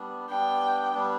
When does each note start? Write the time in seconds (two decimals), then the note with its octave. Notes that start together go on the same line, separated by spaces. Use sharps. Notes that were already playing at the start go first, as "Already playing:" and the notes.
Already playing: G3 B3 D4
0.29 G3 B3 D4 G5
0.94 G3 B3 D4